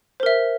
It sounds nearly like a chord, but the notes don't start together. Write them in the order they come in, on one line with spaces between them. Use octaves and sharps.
C5 A#4 E5